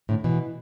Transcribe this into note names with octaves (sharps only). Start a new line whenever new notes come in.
A2 D3
B2 E3